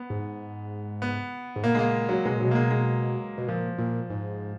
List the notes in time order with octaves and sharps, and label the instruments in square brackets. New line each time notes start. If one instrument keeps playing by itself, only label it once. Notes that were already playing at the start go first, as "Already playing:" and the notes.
Already playing: [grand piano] B3
[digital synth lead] G#2
[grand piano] B3
[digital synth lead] G#2
[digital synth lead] A#2 [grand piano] A#3
[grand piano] G#3
A#3
F#3
[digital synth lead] B2 [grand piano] G#3
[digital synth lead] A#2
[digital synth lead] B2 [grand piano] F#3
[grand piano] A#3
G#3
G#3
[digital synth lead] B2
[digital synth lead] A#2 [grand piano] F3
[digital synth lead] A#2
G#2